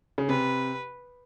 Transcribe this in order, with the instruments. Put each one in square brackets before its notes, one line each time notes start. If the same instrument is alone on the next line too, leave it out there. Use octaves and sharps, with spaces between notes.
[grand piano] C#3
[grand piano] C3 [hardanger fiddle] B4